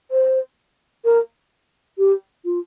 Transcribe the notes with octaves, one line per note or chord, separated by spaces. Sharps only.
C5
A#4
G4
F4